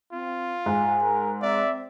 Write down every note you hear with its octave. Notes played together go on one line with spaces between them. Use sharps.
C4 F4
G#2 G#5
A#4
C4 D5 E5